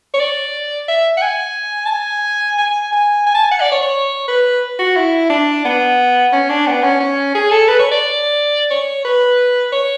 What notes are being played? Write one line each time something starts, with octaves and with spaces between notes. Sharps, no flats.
C#5
D5
E5
F#5
G#5
A5
G#5
G#5
G#5
G#5
A5
G#5
F#5
D5
C#5
C#5
B4
F#4
E4
D4
B3
C#4
D4
B3
C#4
C#4
G#4
A4
B4
C#5
D5
C#5
B4
C#5